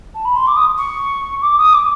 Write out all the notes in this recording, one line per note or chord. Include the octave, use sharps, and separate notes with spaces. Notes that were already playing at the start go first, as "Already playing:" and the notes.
A5
B5
C6
D6
D#6
C#6
D6
D#6
D6